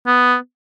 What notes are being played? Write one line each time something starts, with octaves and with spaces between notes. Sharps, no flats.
B3